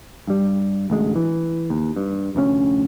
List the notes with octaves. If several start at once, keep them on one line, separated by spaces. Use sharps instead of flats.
G2 G3
A1 D2 G#3
E3
D#2
G2
F1 D2 G#2 C#4